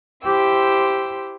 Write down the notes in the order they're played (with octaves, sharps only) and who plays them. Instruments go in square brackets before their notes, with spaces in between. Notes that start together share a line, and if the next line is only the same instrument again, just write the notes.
[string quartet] E4 G4 C5 G5 E6